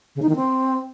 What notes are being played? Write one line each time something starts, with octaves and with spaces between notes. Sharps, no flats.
C#3
D#4
D#3
C4